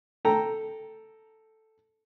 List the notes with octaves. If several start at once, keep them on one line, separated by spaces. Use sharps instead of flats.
A4 G5 A#5